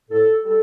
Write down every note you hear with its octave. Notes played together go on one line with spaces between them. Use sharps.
A2 A4
G3 A4